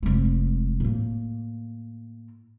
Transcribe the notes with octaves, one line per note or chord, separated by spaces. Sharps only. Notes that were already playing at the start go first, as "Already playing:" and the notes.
F1 G#3
A2 A#3